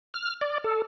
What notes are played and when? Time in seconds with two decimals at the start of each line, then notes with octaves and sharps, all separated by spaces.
0.14 F6
0.41 D5
0.64 A4